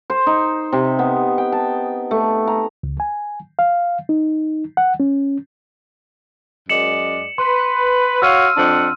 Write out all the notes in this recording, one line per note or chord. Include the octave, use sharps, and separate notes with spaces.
C5
D#4
C3
B3
G5
A5
A3
A#5
C#2
G#5
F5
D#4
F#5
C#4
F#2 G#3 D5 C#7 E7 F#7
B4 C6
F#4 C#5 F5 E6 F6 D#7
F2 D4 F#5